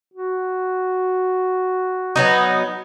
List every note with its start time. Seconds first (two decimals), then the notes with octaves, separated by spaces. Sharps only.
0.14 F#4
2.16 F#3 B3 D#4